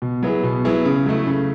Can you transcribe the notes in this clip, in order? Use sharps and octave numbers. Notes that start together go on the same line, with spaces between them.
B2
F#3 B3 E4 G#4
B2
F#3 B3 E4 G#4
C#3
F#3 A3 E4
C#3